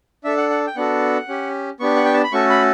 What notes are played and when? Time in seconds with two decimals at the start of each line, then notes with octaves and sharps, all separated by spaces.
0.24 D4 A4 E5
0.37 F#5
0.50 F#5
0.67 G5
0.76 B3 D4 F#4 A4 F#5
1.28 C#4 G4
1.80 B3 D4 G4 C#6
1.96 F#5
2.05 G5
2.14 A5
2.23 B5
2.32 A3 C#4 F#4 A4 C#6
2.50 B5